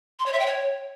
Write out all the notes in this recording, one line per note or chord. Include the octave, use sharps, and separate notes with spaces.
C6
C#5
E5
G5
C#5